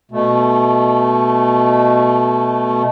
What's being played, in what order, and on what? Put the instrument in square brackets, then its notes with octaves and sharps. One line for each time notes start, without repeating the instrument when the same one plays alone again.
[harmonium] B2 A3